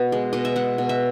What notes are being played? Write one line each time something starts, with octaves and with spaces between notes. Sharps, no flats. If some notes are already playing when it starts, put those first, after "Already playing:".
Already playing: B2
G#3
B2 D#5
E5
G#3 F#5
B2
E5